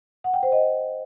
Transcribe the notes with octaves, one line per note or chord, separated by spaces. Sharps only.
F#5
G5
C5
D#5